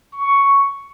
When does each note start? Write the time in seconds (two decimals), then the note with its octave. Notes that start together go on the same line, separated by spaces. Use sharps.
0.13 C#6